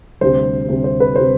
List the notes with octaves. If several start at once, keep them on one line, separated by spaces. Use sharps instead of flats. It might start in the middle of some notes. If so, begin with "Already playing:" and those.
D2 C3 G3 C5
D2 C3 G3
C5
B4
C3 G3 C5